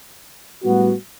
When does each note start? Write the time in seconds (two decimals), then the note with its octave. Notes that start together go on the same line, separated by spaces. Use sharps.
0.63 A2 G3 B3 F#4